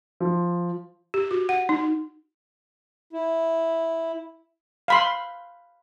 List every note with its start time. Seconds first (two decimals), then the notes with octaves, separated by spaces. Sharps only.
0.20 F3
1.14 G4
1.31 F#4
1.49 F#5
1.69 D#4
3.13 E4
4.88 F5 B5 C6